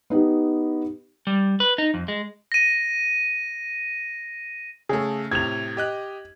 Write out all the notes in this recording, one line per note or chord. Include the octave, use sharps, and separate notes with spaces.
B3 D#4 G4
G3
B4
D#4
F2
G#3
A#6 D#7
C#3 A3 G#4 A4
A2 C3 G#6 F7
G4 D#5 F#6